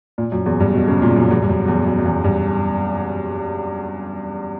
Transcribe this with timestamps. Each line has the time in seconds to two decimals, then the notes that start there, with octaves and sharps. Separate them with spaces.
0.18 A#2
0.32 F#2
0.46 E2
0.60 G2
0.74 B2
0.88 C#3
1.02 A#2
1.16 F#2
1.31 E2
1.42 G2
1.49 F#2
1.68 E2
1.86 F#2
1.99 F#2
2.05 E2
2.24 G2